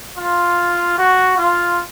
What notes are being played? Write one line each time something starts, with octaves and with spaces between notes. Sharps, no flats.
F4
F#4
F4